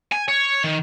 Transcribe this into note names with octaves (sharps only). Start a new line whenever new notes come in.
G#5
C#5
D#3